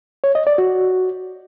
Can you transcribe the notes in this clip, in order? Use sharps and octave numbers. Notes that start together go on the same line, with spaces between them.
C#5
D#5
D5
F#4